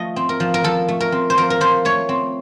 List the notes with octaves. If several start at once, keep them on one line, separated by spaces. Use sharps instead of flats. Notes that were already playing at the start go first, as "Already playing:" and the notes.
Already playing: F3 A3 D#5
C4
A#4
F3
A#4
F3 A4
A3
A#4
C4
C5
F3 A#4
A#4
F3 C5
A3 C#5
C4